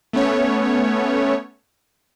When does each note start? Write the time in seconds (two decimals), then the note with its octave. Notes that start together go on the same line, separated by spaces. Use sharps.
0.13 A3 B3 C#4 C#5